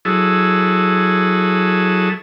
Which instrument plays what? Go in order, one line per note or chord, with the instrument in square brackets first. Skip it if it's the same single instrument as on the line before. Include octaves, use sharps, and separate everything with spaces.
[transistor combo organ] F#3 E4 G#4 A4